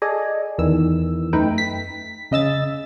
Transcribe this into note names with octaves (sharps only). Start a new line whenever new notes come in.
G#4 A4 D5 D#5 G#5
E2 D#3 E3 E6
F#2 A3 D#4 B4 G5
B6
C#3 D#5 E6 A6